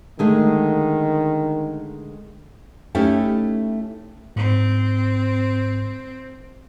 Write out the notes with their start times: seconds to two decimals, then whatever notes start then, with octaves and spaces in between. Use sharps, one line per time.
0.19 D3 D#3 G#3 A3
2.95 A3 C#4 D#4 E4 G4 A4
4.36 G#2 C4